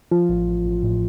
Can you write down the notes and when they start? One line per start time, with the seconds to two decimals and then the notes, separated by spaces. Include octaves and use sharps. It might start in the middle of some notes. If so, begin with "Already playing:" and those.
0.11 F3 F4
0.29 A1
0.47 A1
0.65 A1
0.83 A2